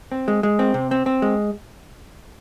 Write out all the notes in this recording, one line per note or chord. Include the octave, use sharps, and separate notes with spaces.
C4
G#3
G#3
C4
C3
C4
C4
G#3